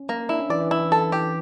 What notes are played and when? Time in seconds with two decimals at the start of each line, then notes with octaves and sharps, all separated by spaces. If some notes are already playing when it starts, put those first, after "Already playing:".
Already playing: C#4
0.09 A#3
0.29 D4 E4
0.40 C#4
0.50 E3 D5
0.60 E3
0.71 E4
0.92 A4
1.12 G4